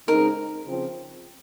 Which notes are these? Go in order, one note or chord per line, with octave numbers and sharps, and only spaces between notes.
C#3 G#3 C4 D#4 A#4
C#3 F3 C4